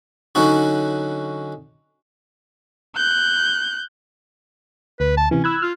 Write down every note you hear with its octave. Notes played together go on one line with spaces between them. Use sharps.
D3 F#3 C#4 D#4 F#4
F#6 G6
D2 B4
A5
C3 E3 C#4
E4 E6 F#6 G#6
F4 F6